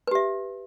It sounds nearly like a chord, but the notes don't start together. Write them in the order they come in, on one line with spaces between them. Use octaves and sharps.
B4 G4 E5